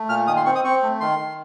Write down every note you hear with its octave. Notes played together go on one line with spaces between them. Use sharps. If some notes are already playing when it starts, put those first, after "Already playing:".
Already playing: A3
A#2 F6
D#3 D#6
C6
C4 C#6
D#6
C4 C#6
A3
D#3 C6
D#3